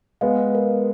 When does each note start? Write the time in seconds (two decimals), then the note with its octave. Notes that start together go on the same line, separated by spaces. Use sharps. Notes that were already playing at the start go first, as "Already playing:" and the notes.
0.21 G#3 B3 F5
0.55 A#4